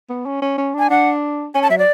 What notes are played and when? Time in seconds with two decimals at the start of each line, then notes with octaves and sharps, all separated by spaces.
0.10 B3
0.26 C#4
0.42 C#4
0.58 C#4
0.74 D4 G#5
0.90 D4 F#5
1.54 C#4 G#5
1.62 A5
1.70 F#3 E5
1.78 D5